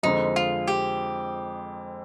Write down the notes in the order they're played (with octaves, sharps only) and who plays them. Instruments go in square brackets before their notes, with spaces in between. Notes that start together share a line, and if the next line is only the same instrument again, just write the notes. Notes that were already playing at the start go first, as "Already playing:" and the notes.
[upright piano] F2 D3 G#3 C4 [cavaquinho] D#4
[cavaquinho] F4
G4